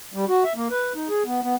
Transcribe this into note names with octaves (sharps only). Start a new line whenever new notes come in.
G3
F#4
E5
A#3
B4
D#4
G#4
B3
B3